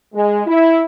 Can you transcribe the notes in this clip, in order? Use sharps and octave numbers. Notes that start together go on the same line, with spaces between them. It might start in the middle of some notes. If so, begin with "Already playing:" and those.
G#3
E4